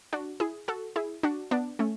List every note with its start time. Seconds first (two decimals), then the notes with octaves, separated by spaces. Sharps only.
0.13 D4 F#4
0.40 E4 G#4
0.68 F#4 A4
0.96 E4 G#4
1.23 D4 F#4
1.51 B3 D4
1.79 A3 C#4